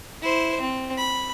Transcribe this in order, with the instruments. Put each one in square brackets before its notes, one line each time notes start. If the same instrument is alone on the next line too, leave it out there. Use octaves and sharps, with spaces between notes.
[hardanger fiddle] E4 C5
C4
B5